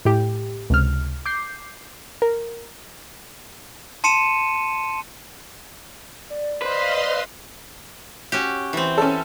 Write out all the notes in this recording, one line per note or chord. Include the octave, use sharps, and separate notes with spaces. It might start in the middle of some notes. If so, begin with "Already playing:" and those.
A2 G4
C#2 C3 F6
D6 G6 C7
A#4
A5 C6 C#7 D#7 E7
D5
B4 C5 D#5 F5 C6
C#4 F#4 G4
E3 C4
C#4 A4